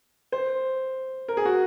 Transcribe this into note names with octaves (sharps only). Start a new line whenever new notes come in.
C5
A#4
G#4
F#4